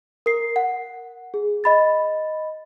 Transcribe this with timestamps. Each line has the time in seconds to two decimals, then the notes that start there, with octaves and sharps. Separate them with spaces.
0.26 A#4 C7
0.56 F#5
1.34 G#4
1.64 D#5 B5 A6